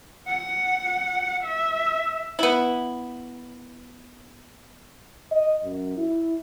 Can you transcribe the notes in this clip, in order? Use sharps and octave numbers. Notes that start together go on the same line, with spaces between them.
F#5
E5
B3 E4
D#5
F#2
E4